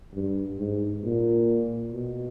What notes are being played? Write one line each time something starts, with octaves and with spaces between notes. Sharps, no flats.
G2
G#2
A#2
B2